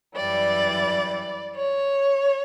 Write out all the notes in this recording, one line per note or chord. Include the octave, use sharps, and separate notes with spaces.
F#2 E3 G3 D5
C#5